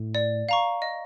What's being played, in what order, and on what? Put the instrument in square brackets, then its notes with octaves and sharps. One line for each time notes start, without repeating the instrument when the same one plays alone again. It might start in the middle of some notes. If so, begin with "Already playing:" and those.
Already playing: [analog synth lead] A2
[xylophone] D5
F5 A#5 C#6
D#5